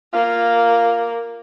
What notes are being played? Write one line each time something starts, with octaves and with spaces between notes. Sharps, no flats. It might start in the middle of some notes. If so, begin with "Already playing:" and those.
A#3 F4